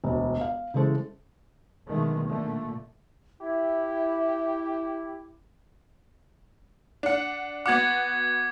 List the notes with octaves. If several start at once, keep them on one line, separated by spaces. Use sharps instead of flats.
E1 D2
F5
C#3 E3 G#3 A4 C5
B1 B2 D3 D#3 G#3 A3
A#2 D3 A3
E4 G4 E5
D4 F#5
B3 F#4 F#5 D6 G#6